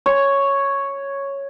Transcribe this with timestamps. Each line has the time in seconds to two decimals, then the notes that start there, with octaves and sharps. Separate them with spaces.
0.06 C#5